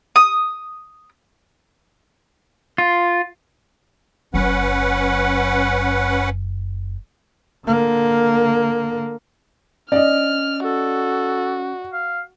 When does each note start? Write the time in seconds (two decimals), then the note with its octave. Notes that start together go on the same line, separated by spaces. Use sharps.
0.16 D#6
2.78 F4
4.34 F#1 F#2 C#4 B4 F#5
7.67 D3 A#3
9.92 C#4 D5 D#5 F6
10.64 F#4 A4
11.93 F5